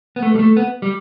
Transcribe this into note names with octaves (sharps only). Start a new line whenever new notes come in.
B3
A3
G3
A3
B3
G3